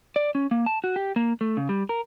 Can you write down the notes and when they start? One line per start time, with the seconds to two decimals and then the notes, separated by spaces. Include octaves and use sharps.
0.16 D5
0.35 C#4
0.51 A#3
0.66 A5
0.84 F#4
0.96 G4
1.16 A#3
1.41 A3
1.57 C#3
1.69 G3
1.89 A#4